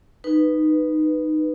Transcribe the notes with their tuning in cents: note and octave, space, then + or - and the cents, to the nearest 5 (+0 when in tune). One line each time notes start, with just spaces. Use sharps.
D#4 -15 B4 +0